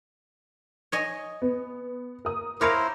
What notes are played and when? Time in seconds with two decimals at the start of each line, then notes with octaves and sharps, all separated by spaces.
0.92 C#5 D#5 G#5
1.42 B3
2.25 A#4 D#6
2.61 E4 A#4 C5 C#5 F5 D6 A#6 D7